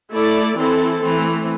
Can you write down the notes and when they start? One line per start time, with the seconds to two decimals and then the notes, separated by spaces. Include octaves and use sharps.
0.12 A3 E4 A4 D5
0.58 E3 C4 E4 A4
1.03 E3 A3 C4